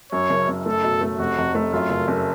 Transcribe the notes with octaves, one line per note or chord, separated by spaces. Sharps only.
F#2 C#5
F#1
F#1
A3 A4
B2
A3
F1 F#4
F1
A3
F#2 F4
F#1
F#1